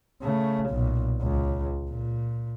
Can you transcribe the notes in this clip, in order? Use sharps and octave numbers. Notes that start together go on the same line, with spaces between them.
C#3 A3
B1 A#2
C#2
A#2